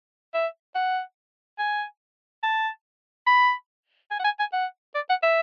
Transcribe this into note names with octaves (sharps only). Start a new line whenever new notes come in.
E5
F#5
G#5
A5
B5
G#5
F#5
G#5
G#5
F#5
D5
F#5
E5